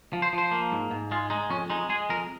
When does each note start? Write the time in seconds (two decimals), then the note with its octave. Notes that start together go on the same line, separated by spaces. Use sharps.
0.13 F3
0.22 C5
0.33 F3 C5
0.52 A#3
0.72 G#2
0.91 G#2
1.11 G#3 F4
1.30 G#3 D#4
1.50 F2 C#4
1.70 G#3 D#4
1.89 G#3 G#4
2.09 F2 A#4